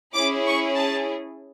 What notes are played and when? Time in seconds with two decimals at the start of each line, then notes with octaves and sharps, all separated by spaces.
0.15 C#4 E4 G#4 D6
0.46 C#6
0.75 A5